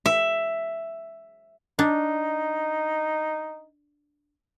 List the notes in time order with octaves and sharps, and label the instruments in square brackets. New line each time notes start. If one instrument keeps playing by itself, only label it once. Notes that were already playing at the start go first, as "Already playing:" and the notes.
[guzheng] E5
[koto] D4 [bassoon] D#4